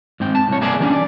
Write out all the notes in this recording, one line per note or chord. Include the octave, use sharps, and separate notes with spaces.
G#2 C4 G5
A5
C2 C#5
A#3 B3 G#4 A#4 D5 E5
E3 G3 C#4 D4
D5